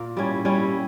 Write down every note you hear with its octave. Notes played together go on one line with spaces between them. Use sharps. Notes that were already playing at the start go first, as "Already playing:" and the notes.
Already playing: A#2 A#3
G3 C#4 E4
G3 C#4 E4